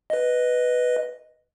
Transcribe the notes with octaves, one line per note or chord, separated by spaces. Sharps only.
B4 D#5